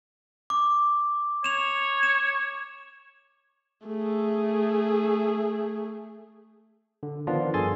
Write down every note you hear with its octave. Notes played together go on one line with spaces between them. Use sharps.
D6
C#5 E7 F7
E7
A3 G#4
D3
D#3 F3 B3 D4 F4
G2 G#4 A4 G#5 C6 A6